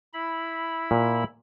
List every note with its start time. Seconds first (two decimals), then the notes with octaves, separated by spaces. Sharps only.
0.13 E4 B5
0.91 A#2